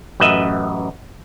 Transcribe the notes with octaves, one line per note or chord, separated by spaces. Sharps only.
A1 F#2 B4 D#5 E5